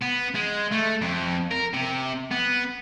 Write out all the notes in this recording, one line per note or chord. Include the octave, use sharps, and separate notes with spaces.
B3
G#3
A3
F2
A#4
C3
B3